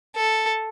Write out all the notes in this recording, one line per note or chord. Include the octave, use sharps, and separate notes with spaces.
A4